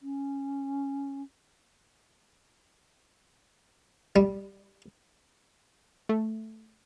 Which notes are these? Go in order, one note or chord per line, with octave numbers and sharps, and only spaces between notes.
C#4
G3
A3